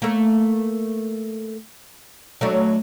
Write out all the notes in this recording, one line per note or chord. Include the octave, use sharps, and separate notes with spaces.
A3 A#3
F#3 A3 D4